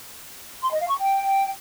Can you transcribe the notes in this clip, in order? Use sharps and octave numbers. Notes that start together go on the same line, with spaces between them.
C6
D#5
F5
C#6
G5